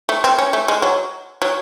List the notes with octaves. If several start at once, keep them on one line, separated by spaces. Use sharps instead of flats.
A3
C4
C#4
A3
G#3
F#3
F#3